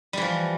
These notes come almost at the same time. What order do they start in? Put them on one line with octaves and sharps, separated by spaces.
G3 E3 F3